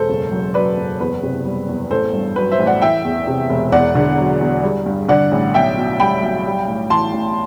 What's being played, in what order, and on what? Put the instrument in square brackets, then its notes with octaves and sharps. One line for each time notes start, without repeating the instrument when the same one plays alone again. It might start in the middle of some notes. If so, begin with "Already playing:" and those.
Already playing: [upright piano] E1 A4 C5
F#1
F#2
F#3 B4 D5
F#1
E2 B4
C3
G3
E2
A1 A4 C5
G2
F#3 B4
C5 E5
A1
D5 F#5
E3 E5 G5
E2
C3
E1
E2 D5 F#5
D3
F#3
E2
G3
G2
D3 D5 F#5
A1
B1 E5 G5
B2
G3 G5 B5
B1
G3
A2
E3 A5 C6
A1